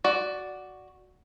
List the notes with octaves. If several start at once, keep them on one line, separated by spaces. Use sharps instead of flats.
F#4 D5